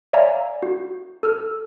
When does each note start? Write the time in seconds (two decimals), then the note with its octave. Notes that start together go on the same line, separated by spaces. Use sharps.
0.13 C#5 D5 E5 F5 G#5 A#5
0.63 F#4
1.23 A4 E6 F6